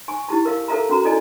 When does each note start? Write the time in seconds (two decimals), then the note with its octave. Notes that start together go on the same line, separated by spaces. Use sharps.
0.08 G#5 C#6
0.28 E4 G4 A5
0.45 A#4 F5
0.68 A4 A#4 E5 F5 A5 A#5
0.89 C#4 F#4 A#5
1.04 E4 A4 D5 D#5 G#5